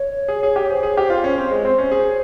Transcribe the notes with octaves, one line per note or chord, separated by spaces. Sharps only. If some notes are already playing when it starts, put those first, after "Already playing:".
Already playing: C#5
G#4
G#4
G4
G#4 C5
G#4
G4
F4
C#4
C4
G#3
C4
C#4
G#4